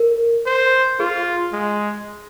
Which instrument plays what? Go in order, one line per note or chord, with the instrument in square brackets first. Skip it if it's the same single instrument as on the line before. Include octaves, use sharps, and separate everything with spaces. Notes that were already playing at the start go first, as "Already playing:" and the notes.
Already playing: [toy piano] A#4
[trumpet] C5
[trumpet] F4 [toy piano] G#4
[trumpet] G#3